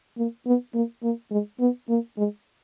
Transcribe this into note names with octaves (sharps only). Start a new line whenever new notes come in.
A#3
B3
A#3
A#3
G#3
B3
A#3
G#3